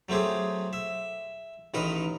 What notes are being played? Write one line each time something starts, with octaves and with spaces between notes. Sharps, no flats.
F#3 A3 C4 G4 G#4
E5
A1 D#3 A#4 B4 D#5